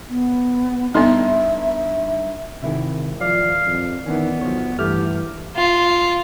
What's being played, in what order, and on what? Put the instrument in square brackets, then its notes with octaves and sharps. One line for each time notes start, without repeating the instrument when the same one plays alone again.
[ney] B3
[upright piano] G2 D#4 C6 [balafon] B3 A4 [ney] E5
[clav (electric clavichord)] G#1 E4 E5 [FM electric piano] C3 D#3
[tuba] F3 [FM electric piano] D5 [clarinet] F5
[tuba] F2
[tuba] D#3 [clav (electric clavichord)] E3 C#4 [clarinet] B3
[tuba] B1 [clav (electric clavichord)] F3 C#5
[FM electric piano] G2 E4 F6 [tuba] E3 [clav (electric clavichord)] A3 [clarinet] G4
[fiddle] F4